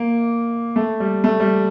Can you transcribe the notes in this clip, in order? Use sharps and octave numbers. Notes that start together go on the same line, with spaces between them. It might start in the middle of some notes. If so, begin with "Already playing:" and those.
Already playing: A#3
A3
G3
A3
G3